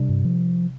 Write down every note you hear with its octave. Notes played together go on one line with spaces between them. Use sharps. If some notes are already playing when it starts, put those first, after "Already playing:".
Already playing: C3 G3 D4
G2
F3